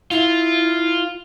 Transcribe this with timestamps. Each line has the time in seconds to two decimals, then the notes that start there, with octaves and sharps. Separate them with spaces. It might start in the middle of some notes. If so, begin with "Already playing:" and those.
0.11 E4 F4